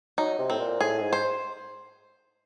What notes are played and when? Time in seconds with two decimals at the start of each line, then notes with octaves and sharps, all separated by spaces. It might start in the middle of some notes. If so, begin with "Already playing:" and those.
0.18 F#3 D#4
0.39 C3
0.50 A2 C4
0.60 A#2
0.81 A2 G#4
1.02 G#2
1.13 C5